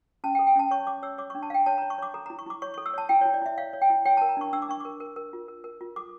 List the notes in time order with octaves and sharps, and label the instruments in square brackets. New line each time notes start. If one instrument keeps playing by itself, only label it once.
[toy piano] C#4 A5
G5
A4
G5
C#4 A5
C#5 C#6
C#5 D6
C#5 E6
C#5 D6
C#6
D4
A5
D4 F5 G5
C#5 A5
A#5
C#5
C#6
C#5 D6
A4 A#5
A#5
E4
C#6
E4 D6
C#5 C#6
C#6
A4
E6
C#5 A5
E4 G5
C#5
E4
D5
E4 E5
C#5 F5
C#5
G5
E4
C#5 G5
A5
A#4
A#5
D4 C#6
D4 E6
D6
D4 C#6
A#4 D6
A#4
A#4
F4
A#4
A#4
F4
A4 D6